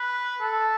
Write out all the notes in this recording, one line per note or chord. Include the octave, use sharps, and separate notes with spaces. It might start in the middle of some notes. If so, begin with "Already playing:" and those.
Already playing: B4
A4